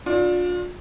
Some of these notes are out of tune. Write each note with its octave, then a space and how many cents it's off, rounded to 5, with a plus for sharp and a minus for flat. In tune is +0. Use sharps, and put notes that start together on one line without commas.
D4 -5 F4 +35